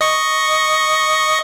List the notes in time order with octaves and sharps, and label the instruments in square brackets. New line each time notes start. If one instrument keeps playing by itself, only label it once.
[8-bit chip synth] D#5 C#6